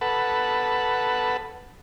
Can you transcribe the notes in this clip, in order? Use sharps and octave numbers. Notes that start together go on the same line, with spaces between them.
A4 B4 F#5